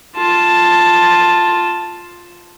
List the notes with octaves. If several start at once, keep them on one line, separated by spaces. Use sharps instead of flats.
F4 A5